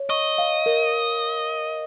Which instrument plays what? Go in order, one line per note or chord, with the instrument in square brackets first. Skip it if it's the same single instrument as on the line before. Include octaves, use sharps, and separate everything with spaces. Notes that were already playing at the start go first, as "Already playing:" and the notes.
Already playing: [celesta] C#5
[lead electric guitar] D#5 [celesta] C#6
[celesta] F5
A#4